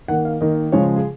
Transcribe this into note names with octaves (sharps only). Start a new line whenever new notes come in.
D#3 A#3 F#5
F5
D#3 A#3 D#5
C#3 F3 G#3 C#5
G#4